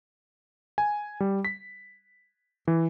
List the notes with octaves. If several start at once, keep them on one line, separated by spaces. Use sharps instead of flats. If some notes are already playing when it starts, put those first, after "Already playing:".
G#5
G3
B6
E3